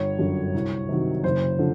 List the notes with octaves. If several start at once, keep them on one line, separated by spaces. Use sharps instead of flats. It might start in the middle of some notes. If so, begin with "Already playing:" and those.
Already playing: G1 C#5
F#2 D3
C2
C3 D#3 F#3
F#1 C5
D3 F3